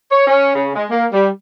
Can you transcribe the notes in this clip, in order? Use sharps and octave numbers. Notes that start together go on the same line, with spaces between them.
C#5
C#4
C#3
G#3
A#3
G3